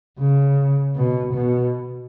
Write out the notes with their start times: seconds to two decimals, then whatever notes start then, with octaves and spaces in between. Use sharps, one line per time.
0.20 C#3
0.96 B2
1.34 B2